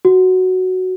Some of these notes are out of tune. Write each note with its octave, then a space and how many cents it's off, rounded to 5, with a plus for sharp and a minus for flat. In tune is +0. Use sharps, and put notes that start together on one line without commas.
F#4 +5